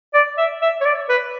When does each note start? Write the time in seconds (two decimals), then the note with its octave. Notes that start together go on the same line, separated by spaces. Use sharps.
0.14 D5
0.38 E5
0.62 E5
0.81 C#5
0.85 D5
1.09 B4